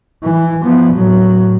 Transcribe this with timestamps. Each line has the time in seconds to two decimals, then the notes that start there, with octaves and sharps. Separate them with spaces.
0.24 E3
0.63 F3 B3
0.94 A2 F#3